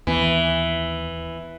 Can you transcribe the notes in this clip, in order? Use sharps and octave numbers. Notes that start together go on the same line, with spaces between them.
D#2 E3 B3